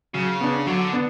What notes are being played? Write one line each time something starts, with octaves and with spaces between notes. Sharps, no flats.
C#3 F#3
B3 D4
D3 F#3
B3 D4